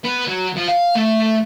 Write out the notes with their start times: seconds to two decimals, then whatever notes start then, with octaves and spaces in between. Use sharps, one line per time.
0.04 B3
0.27 F#3
0.56 F3
0.68 F5
0.95 A3